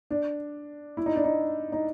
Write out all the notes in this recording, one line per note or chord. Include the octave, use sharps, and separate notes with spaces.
D4
E4
D#4
D4
D#4
D#4